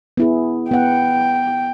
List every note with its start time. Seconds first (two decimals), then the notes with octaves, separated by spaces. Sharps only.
0.17 B3 E4 G#4
0.71 B3 F#5 G5